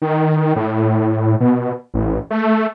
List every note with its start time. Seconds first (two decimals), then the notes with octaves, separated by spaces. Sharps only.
0.02 D#3
0.56 A2
1.40 B2
1.94 A1
2.30 A3